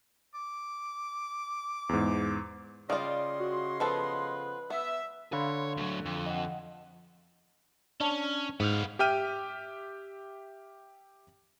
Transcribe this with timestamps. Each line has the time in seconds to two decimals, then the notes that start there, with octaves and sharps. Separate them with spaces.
0.34 D6
1.89 E2 G#2
2.90 C#3 G3 F4 D5 D#5 F5 C6 D#6
3.40 F#4
3.80 F3 B3 A4 B4
4.70 B3 E5
5.33 D3 C#5 F5 B5 C6
5.77 D2 F#3
6.05 F2
6.26 D#5 F#5
8.00 C#4 D4
8.60 G#2 B3 F5
8.99 G4 E5 G5 F6 D#7